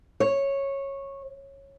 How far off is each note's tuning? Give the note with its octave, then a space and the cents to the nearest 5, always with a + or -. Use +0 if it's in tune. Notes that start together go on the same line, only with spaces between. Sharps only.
C#5 -10